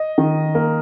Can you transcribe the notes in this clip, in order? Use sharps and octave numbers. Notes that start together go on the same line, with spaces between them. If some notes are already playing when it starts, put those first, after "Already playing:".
Already playing: D#5
D#3
A#3